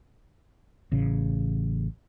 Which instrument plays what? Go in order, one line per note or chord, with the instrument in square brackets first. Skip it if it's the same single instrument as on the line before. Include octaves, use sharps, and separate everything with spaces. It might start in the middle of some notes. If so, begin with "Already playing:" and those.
[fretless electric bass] A1 C#3